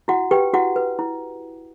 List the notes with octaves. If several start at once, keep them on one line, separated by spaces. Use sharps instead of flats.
E4 F#4 F#5
G4 B4 G5
E4 F#4 F#5
B4
E4